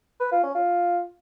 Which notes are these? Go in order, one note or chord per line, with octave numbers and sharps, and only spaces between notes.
B4
F4
C#4
F4